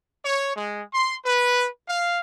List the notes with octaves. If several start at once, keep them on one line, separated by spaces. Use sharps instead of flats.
C#5
G#3
C6
B4
F5